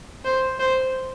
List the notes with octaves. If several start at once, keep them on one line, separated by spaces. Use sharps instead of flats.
C5
C5